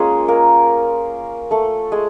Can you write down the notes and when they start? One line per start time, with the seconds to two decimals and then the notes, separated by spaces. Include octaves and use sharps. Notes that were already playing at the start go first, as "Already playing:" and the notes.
Already playing: G#3 A#3 C#4 F4 G#4
0.28 A#3 A#4
1.51 A3 A4
1.92 G#3 G#4